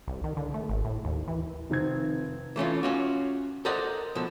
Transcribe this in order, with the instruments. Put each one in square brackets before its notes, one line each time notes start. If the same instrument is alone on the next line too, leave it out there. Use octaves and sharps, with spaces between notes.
[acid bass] C2
D#3
D3
A3
G#1
A2
D#2
E3
[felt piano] F1 D#3 C4 G#6
[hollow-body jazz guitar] E3 A3 C#4 F4
C#4 F4 F#4
A4 A#4 C5 D5 D#5 F#5
B2 F3 A4